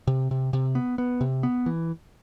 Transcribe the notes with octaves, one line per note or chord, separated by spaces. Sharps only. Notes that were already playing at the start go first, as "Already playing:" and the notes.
C3
C3
C3
B3
B3
C3
B3
E3